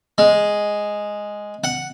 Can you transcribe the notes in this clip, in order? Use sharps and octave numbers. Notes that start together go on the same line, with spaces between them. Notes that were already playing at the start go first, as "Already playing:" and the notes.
G#3
F#5